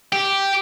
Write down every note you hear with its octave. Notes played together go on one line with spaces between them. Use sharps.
G4